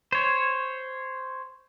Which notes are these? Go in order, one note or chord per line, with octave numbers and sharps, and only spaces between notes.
C5 C#5